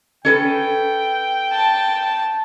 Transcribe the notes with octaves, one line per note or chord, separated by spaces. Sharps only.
C#4 A4 B4 G5
A5